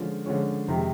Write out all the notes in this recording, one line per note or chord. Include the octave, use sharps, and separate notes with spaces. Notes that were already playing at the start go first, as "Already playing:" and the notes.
Already playing: D3 F3 G#3 C#4
D3 F3 G#3 C#4
F2 C3 D#3 G#3